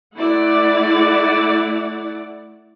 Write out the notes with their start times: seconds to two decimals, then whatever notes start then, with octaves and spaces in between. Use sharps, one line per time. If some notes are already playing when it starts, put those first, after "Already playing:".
0.16 A3 E4 D5 F#5